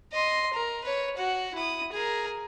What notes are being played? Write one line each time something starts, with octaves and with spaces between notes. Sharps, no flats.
D#5 C6
A#4
B4 C#5
F#4 F#5
E4 D#6
G#4 A#4